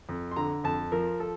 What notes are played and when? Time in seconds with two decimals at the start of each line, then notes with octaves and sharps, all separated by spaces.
0.09 F2
0.31 C6
0.36 D3 A#5
0.64 F2 A5
0.92 F3 A#4
1.20 A4